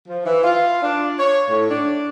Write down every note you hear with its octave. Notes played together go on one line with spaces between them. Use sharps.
F3
E3
F4
D4
C#5
A2
D4